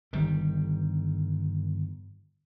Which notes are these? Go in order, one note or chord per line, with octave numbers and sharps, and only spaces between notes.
G1 D#3 G3